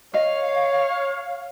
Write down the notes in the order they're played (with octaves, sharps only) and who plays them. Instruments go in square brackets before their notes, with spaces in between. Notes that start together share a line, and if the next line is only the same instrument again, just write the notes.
[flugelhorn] C#5 [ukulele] D#5 [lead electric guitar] F5